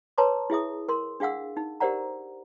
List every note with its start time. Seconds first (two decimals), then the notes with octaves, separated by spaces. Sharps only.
0.18 B4 C#5 A5 A#5 C6 D6
0.50 E4 G#4 E5 D#6
0.89 A#4 C6
1.20 D4 G#4 F5 F#5 E6
1.57 D#4
1.80 G4 A#4 C5 D5 F#5 A#5